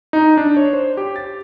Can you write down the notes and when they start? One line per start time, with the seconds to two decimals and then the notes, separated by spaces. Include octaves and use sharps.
0.13 D#4
0.37 D4
0.57 C#5
0.73 C5
0.97 G4
1.16 A6